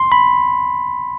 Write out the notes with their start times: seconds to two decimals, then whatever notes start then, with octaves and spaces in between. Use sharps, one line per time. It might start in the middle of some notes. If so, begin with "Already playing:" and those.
Already playing: C6
0.12 B5